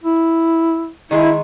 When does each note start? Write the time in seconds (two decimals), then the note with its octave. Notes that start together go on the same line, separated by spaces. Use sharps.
0.03 E4
1.11 D#3 G#3 E4 G#4